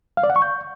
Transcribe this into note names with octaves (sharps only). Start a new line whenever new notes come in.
F5
D5
F#5
C#6
G6